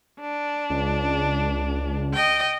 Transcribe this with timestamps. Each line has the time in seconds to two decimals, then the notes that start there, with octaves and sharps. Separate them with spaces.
0.20 D4
0.70 C#2
2.14 D#5 G5